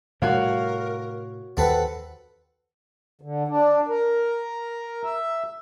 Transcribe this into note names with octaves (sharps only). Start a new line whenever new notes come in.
A2 C3 G3 F#4 A#4 C#5 F5
D#2 C4 A4 B4 F#5
D3
D4
A#4
E5